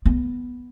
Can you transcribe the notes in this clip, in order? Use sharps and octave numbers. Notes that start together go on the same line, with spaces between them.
B3